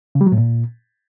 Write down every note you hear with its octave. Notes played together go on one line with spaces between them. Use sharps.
C#3
G3
F#3
A2
A#2